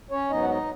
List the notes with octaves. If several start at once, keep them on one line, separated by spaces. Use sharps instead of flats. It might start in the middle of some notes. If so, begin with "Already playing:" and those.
C#4 C#5
G#2 F#3 B3 D#4 D#5
F#5
D#4 D#5